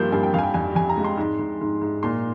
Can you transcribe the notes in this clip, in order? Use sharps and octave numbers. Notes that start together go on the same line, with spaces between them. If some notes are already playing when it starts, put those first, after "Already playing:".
Already playing: G2 F3 G3 A#3 C6 G6
G2 G#5
G5
F2 F5 G#5
G5
F2 G#5
F2 G#5
A#5
G#3
C6
G#2
G#2
G#2
G#2
A#2 C6